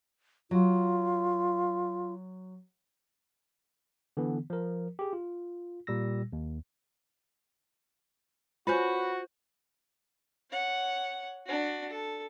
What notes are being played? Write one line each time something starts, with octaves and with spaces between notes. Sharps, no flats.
F#3 F4
D3 E3 B3
F3 A#4
G4 G#4
F4
A#2 G3 E6 A#6
D#2
C#4 F4 F#4 B4 C5 G6
C#5 F#5
D4 F#4
A4